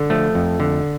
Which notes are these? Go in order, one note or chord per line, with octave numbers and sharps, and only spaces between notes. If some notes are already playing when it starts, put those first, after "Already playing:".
Already playing: D3
F3 A3
F2
D3